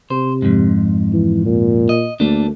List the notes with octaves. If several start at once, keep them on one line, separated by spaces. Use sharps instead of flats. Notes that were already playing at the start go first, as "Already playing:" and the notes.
C3 C5
F2 G#2
E3
A#2
D#5
D2 A3 A#3 D4